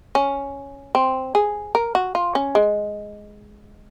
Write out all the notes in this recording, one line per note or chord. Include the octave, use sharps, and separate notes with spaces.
C#4
C4
G#4
A#4
F#4
F4
C#4
G#3